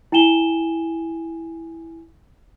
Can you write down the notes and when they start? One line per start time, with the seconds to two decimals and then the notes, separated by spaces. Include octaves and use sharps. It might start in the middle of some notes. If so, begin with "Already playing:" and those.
0.12 E4 G5 G#5 E7 G7